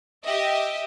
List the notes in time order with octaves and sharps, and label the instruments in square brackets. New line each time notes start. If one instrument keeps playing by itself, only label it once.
[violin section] G4 D#5 E5